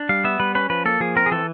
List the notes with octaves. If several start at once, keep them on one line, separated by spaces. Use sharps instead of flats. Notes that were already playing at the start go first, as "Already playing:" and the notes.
Already playing: D4
G3 F5
B3 E5
G3 B4
C#4 B4
F3 B4
A#3 A4
F3 G#4
C4 A#4
G#4
E3 A4